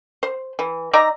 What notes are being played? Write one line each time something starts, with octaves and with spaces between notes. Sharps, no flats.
C5
E3
D#4 D5 E5 A#5